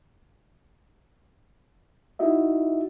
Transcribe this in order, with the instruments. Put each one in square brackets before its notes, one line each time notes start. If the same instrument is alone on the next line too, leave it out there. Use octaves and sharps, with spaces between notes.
[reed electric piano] D#4 E4 F#4 D#5 E5